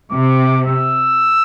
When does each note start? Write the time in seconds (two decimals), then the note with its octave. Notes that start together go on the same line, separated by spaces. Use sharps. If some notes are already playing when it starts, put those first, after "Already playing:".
0.12 C3 D6
0.67 E6